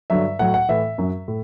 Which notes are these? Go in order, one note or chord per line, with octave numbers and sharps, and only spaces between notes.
G2 D3 F#3 E5
A2 F#3 F#5
F#5
A2 E3 E5
F#2 F#3
A2